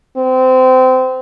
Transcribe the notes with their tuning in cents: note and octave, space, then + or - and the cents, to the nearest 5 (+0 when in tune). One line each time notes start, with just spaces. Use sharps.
C4 -25